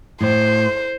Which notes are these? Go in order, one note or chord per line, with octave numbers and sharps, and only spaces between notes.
A2 C5